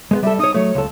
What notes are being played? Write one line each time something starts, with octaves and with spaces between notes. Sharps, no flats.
G#3 A3 B3
G3 A4 E5
D#4 C#5 D#6
F#3 A3 C#5
C#2 A4